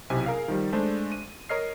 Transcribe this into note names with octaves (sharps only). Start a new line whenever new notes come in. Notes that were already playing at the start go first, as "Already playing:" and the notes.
B1 C3 C4 E4 G#5
G#4 A#4 F5
D#3 F3 G3
G#3 A3 D4 C5
D#7
A#4 C#5 D#5 F6 C7